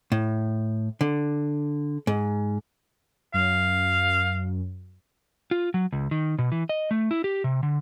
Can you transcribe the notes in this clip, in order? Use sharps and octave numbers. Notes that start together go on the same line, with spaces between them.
A2
D3
G#2
F#2 F5
F4
F#3
C#2
D#3
B2
E3
D#5
A3
E4
G4
C3
D3